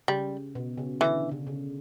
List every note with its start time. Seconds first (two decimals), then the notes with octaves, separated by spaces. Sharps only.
0.08 C#3 G3
0.55 B2
0.78 C#3
1.00 D3 E3
1.32 C#3
1.47 C#3